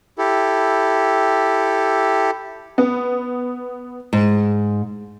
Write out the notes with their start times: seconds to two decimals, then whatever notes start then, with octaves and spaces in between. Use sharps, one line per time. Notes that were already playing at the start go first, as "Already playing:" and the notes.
0.18 E4 G4 A4
2.78 B3
4.13 G#2